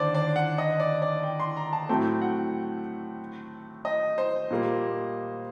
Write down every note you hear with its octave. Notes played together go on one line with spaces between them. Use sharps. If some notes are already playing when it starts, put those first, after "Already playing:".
Already playing: D#2 D3 D4 C5 D5
D5
F#5
D#5
D5
D5
G5
C6
A#5
A5
A2 F#3 A3 C4 G5
F#5
D#5
C5
A#2 G3 A#3